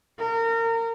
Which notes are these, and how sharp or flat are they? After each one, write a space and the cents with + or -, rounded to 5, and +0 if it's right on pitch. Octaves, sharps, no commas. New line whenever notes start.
A#4 -30